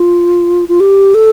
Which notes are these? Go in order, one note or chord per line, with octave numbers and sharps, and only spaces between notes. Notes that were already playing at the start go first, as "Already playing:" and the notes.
Already playing: F4
F4
G4
A4